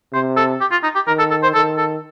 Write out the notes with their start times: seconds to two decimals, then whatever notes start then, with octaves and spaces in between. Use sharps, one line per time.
0.13 C3 C5
0.37 A4
0.61 G4
0.71 F4
0.83 D#4
0.95 G4
1.07 D#3 A#4
1.19 A4
1.31 A4
1.43 C5
1.55 D#3 A4
1.78 A4